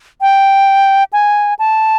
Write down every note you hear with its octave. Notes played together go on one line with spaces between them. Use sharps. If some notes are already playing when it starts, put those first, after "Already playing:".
G5
G#5
A5